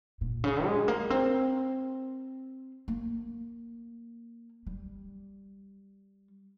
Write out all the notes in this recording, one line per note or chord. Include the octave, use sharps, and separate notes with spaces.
A#2
C#3
G#3
A#3
C4
A#3
G3